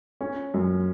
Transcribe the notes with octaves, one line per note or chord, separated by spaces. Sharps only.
C#4
F#2